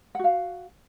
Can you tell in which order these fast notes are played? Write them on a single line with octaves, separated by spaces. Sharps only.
F#5 F#4 F5